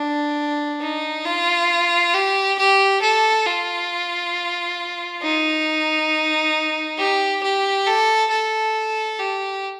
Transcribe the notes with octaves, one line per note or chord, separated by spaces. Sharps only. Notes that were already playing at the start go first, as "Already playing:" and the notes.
Already playing: D4
D#4
F4
G4
G4
A4
F4
D#4
G4
G4
A4
A4
G4